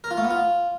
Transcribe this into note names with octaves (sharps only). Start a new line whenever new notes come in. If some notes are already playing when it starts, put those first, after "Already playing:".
A#4
F4
A3
B3
F4